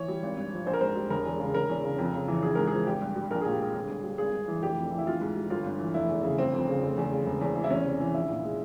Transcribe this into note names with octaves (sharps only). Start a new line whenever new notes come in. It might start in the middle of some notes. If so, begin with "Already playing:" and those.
Already playing: E3 C#5
G3
G#1
G2
F3
A#1 C5
A#4
G#2 C5
G3
E1 A#4
E2
C#3
E1 A#4
E2
C#3
F2
C#3
E3
A#1 G#4
G#2 A#4
F3 G#4
G#1 G4
G2
G3
A#1 A#4
A#2 G#4
G4
G#3 G#4
G1
G2
G3
G#1 G#4
G2
E3
F1 G4
F2
E3
E4
A#1 F4
G#2
G3
G1 F4
G2
E3
F1 E4
E2
C#3
G1 C4
F2
C#3
F1
E2
C#3
E1
E2
E3
E4
E2 C#4
C3
E3
A#1 E4
A#2
G#3